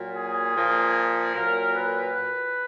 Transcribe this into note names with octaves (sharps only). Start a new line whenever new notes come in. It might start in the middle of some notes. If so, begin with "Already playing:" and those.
Already playing: A#2 F#3
G#4
A#2 F3
A#2 F#3 A#4
B4